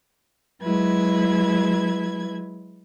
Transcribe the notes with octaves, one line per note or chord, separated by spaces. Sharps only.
F#3 G#3 E4 B4 G#6